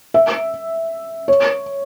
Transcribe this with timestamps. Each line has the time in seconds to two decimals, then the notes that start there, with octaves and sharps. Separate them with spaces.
0.14 E5
1.28 C#5